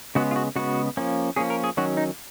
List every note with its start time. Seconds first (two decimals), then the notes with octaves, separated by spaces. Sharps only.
0.15 C#3 G#3 B3 F#4
0.31 F4
0.36 F#4
0.56 C#3 G#3 B3 F#4
0.97 F3 A#3 C#4
1.36 F3 A#3 C#4 G#4
1.50 A#4
1.64 G#4
1.77 D#3 F#3 C#4 F#4
1.97 D#4